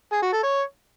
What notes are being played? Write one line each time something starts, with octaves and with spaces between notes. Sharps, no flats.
G#4
F#4
A4
C#5